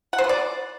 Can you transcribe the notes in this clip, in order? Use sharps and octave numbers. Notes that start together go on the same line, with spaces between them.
F#5
C5
B4
D5